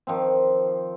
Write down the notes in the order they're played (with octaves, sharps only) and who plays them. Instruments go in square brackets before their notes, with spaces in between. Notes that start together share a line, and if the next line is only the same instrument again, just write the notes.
[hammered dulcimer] D#3 F3 C4